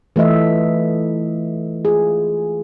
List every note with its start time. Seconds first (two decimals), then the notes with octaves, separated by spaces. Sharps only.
0.16 E3 A3 F4 D#5 E5
1.85 F4 G#4